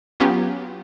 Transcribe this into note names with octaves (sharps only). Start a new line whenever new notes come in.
F#3 B3 C#4 F4 G4